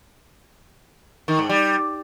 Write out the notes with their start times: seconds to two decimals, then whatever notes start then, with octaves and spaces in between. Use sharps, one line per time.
1.28 D#3
1.39 G#2
1.49 G3